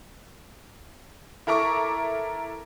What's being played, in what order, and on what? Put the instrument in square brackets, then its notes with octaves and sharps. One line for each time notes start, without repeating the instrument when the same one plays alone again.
[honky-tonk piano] E4 A4 A#4 A#5 C#6 D6